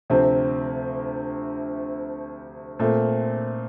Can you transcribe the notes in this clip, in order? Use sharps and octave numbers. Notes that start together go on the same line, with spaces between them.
D2 C3 F3 C4
A#2 A3 C4